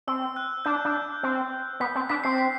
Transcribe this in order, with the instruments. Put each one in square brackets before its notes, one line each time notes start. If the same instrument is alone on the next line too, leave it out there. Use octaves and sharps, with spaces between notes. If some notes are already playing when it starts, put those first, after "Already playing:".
[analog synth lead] C4 [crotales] E6
[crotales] F#6
[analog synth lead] D4 [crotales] G6
[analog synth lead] D4
C4
[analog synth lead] B3 [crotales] B6
[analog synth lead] C4
[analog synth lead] D4 [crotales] B6
[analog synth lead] C4 [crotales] C7
[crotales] B6